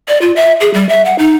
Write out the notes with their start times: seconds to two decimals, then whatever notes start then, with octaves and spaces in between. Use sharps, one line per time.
0.08 D5
0.22 F4
0.36 E5
0.61 G#4
0.74 G3
0.89 E5
1.06 F#5
1.19 D#4